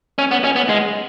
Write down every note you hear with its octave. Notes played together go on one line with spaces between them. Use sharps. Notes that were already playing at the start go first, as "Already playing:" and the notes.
C#4
B3
C#4
B3
G#3